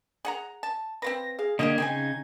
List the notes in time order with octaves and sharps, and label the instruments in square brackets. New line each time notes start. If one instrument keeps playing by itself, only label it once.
[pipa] G#4 F#5 A#5
A5
[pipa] C4 F4 B4 [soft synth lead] A#6
[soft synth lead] G#4 [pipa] F5
[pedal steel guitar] D3 A#3 G4 [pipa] D#3 A4 D#5 [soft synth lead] G#6
[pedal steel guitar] C#3 D#4 [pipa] C4 G5 G#5